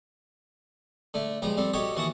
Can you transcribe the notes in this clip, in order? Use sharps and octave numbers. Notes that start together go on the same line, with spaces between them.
D3 A3
C#2 F3 G3 A#5
G3 C4 A4
F#4 G4 A4 C#5 D#5
D#2 E3 F#4 F#5 A5 D#6